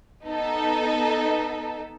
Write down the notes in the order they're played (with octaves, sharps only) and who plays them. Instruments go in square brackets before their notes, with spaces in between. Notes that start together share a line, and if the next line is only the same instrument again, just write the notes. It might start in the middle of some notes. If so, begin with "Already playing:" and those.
[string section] B3 D#4 A4